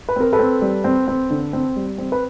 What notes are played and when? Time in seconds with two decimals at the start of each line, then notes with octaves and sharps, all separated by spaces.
0.09 B4
0.16 C4 A#4
0.33 A4 B4
0.39 C4
0.62 G3
0.84 C4
1.08 C4
1.30 D3
1.53 C4
1.76 G3
1.98 C4
2.12 B4